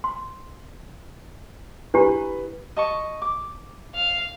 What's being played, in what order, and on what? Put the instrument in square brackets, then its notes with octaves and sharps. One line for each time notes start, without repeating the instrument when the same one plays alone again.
[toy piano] C6
[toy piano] D4 E4 G4 [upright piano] B4
[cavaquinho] D#5 A5 C#6
D6
[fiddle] F5